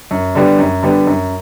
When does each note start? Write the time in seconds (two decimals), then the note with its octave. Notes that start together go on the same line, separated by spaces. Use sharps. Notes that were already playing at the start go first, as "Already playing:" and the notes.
0.11 F#2
0.35 D3 G3 B3
0.59 F#2
0.83 D3 G3 B3
1.07 F#2